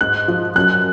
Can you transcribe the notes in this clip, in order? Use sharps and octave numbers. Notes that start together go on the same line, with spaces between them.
G#2 F#6
F3
F#2 F#6